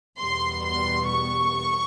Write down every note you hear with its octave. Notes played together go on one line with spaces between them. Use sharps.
E2 B2 G3 B3 C6
C6
C#6